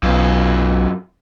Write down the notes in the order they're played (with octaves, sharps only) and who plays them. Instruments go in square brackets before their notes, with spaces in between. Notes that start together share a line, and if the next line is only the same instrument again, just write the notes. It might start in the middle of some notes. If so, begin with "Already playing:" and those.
[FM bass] B1 [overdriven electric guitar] F#2 F4